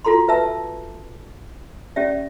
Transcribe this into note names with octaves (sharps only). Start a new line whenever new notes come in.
F4 F#4 A4 A#5 C6
B4 E5 A5 E6
C#4 G4 D5 E5